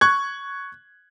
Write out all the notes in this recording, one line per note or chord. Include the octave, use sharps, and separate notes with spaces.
C#6 F#6 G#6